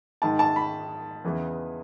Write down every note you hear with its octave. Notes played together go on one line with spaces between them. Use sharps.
G#2 D#3 A5
A5
B5
E2 C#3 E3